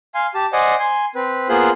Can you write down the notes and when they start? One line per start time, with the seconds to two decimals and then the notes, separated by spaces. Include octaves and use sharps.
0.15 F5 G#5 C6
0.35 G4 A5
0.53 C5 D5 D#5 F#5 G#5
0.80 G#5 C6
1.15 C4 B4
1.49 A#3 B3 F4 G#4 C5 F#6